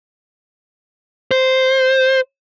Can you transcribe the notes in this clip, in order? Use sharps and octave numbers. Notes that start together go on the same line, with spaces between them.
C5